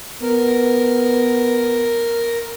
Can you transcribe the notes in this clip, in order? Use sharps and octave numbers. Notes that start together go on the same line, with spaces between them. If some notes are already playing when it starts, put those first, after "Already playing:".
B3 A#4